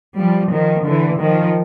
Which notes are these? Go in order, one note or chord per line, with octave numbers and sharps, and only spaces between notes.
F3 G3
D#3 F3
D3 E3
D#3 F3